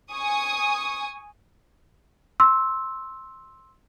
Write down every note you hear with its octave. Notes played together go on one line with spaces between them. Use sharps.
G#5 C#6 D#6
C6 E6